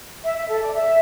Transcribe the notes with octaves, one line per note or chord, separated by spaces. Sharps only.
E5
E5
A4
D5
E5